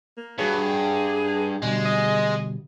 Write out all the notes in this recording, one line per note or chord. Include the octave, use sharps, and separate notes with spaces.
A#3
G2 F#4 G#4 C#5
B2 D3 G3 G#3
D#5